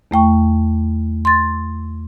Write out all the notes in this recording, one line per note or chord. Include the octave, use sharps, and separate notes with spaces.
E2 A3 G5 C#6
C6 A6